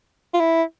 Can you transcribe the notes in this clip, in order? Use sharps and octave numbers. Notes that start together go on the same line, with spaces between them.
F4
E4